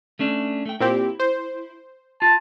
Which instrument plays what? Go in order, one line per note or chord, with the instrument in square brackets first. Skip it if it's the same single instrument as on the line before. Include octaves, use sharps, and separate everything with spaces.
[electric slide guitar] A3 C#4 D4
A3 G5
[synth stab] A#2 C4 G4 [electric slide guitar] E4
[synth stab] C5
[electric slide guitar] F4 [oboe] A5